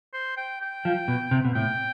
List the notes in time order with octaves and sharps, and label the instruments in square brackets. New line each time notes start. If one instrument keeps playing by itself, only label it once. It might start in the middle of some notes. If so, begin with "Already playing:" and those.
[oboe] C5
G5
G5
[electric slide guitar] F3
B2
C3
B2
[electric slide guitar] A2 [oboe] G5